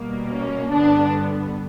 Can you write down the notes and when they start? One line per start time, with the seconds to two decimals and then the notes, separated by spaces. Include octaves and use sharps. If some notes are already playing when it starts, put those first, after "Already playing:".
Already playing: B2 G3 A#3
0.30 C#4
0.71 G2 D3 G3 B3 D4